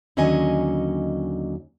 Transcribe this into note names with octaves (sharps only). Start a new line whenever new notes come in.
D#2 D3 F#3 C#4 D#5 G#5